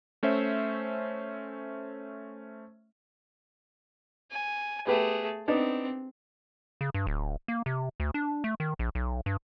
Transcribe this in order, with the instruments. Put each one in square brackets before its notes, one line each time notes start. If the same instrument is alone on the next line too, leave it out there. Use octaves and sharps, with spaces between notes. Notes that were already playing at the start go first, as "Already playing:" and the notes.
[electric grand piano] A3 C#4 C5 E5
[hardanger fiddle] G#5
[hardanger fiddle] A3 G#4 [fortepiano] B3 G4 B4
[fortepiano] B3 D4 D#4 [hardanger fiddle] C4
[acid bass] C#3
G2
D1
A#3
C3
D2
D4
A3
D#3
A#1
B1
G2